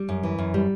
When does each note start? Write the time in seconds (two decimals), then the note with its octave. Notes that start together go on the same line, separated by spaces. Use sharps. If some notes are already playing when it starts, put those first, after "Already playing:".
Already playing: G3
0.09 F#2
0.23 E3
0.38 F#2
0.54 G3